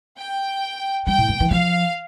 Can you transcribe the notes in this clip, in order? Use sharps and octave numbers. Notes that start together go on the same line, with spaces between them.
G5
G3 G5
A2
G2
E3
F3 F5